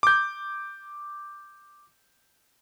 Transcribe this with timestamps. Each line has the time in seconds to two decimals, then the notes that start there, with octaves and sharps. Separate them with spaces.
0.03 D6 G6